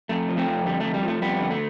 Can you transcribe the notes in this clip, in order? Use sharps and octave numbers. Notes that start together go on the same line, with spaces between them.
F2 A3
F3
A3 C4
F2
D3 G3
F2 A3
G3
F3 A3
F2 G3 B3
D3
A3